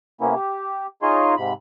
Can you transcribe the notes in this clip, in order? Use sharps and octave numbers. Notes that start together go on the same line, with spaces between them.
C3 A#3 B3 C#4 E4
G4
D#4 F4 G#4 C#5 D#5 C6
G#2 C3 B5